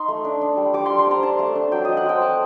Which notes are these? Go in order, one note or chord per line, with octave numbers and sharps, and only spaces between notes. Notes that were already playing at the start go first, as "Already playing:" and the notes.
Already playing: D#4 C6
A3
D4
D4
G3
G3 D6
G3 C6
C6
C4 A#5
D4 A5
A3
D4
F#3 G5
F#3 D#5
F#5
C4 G5
A3 A5